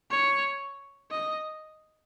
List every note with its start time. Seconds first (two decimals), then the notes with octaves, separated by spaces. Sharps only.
0.11 C#5
1.12 D#5